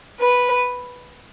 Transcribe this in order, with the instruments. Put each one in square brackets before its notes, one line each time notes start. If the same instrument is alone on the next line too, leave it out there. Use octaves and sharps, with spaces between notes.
[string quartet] B4